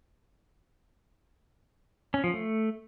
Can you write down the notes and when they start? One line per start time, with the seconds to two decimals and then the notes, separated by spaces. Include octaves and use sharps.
2.14 C#4
2.24 F3
2.34 A3